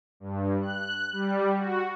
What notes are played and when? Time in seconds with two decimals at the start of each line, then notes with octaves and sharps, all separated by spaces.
0.20 G2
0.61 F#6
1.13 G3
1.56 F#4